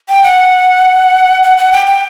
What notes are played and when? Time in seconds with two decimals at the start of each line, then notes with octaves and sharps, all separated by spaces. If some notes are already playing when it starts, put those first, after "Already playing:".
0.09 G5
0.23 F#5
1.43 F#5
1.57 F#5
1.72 G5
1.86 G5